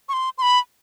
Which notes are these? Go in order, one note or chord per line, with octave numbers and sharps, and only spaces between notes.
C#6
C6
C6
B5